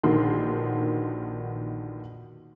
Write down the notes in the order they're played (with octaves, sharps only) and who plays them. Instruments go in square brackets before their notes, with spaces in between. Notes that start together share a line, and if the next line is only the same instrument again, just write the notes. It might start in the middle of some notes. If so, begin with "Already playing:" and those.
[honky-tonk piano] A#1 B2 D3 D#3 C6